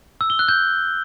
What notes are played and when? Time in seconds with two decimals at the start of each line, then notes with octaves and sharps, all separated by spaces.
0.21 E6
0.30 G7
0.39 F#6
0.48 G6